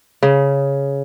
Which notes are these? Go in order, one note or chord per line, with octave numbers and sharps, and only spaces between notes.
C#3